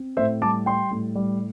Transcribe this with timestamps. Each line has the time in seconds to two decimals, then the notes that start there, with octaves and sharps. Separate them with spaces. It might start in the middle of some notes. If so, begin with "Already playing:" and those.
Already playing: C4
0.17 A2 C5 E5
0.42 G3 A5 D6
0.66 G3 G5 C6
0.91 A2
1.15 G3